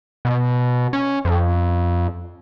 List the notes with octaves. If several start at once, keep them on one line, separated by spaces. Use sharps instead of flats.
B2
C#4
F2